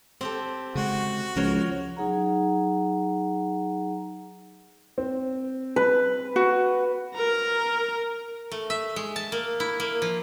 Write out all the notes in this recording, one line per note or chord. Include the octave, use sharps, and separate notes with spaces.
C4 G4 A4
C#3 G#3 F#4
C#2 F3 A#4 C#5
F#3 D#4 G#4 F#5 A#5
C4
B4
F#4
A#4 A#5
A3
E5
G#3
A5
A#3
E4
A#3
F3